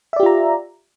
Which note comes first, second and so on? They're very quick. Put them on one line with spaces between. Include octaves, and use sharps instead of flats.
E5 D5 G4 F4 A#5